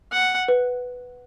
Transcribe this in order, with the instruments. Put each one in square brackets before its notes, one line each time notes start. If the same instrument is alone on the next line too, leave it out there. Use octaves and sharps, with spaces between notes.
[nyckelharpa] F#5
[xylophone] B4